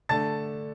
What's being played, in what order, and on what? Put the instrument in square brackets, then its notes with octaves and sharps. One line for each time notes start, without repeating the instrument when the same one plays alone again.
[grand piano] D3 A3 D4 A5 A6